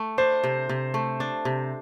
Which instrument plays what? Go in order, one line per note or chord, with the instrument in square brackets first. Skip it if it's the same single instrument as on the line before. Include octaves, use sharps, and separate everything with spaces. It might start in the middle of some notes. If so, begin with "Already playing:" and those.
Already playing: [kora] A3
[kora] D4 [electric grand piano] C5
[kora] C3
C3
A3
D4
C3